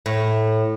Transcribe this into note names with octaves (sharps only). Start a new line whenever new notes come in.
A2